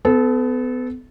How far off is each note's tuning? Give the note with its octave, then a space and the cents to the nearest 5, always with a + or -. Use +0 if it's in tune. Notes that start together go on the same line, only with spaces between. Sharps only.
B3 +30 A4 -20